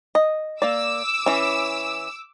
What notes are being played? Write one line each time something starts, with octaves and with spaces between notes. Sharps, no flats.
D#5
A#3 D5 D6 E6
E3 C#4